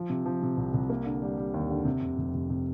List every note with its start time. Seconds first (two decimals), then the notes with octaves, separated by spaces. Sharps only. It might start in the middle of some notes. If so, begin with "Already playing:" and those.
Already playing: F3
0.10 C3
0.26 F3
0.43 C3
0.57 C2
0.74 C2
0.90 A#3
1.05 D3
1.22 G3
1.38 G3
1.54 D#2
1.70 D3
1.85 C3
2.02 F1
2.18 F1
2.34 F1
2.50 C3